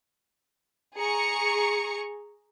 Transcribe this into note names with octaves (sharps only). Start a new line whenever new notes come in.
G#4 A#5 C#6 C#7